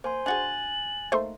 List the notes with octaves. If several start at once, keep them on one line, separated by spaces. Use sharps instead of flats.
A#3 C5 G#5 C6
D4 F#4 G#4 G#5 F#6 A6 F#7
A3 A#3 D#4 C5 C6